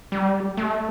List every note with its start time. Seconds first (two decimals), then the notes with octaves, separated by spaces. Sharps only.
0.12 G3
0.57 A3